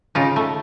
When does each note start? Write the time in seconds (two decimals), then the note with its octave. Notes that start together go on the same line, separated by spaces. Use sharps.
0.15 C#3 D#4 F4
0.36 A3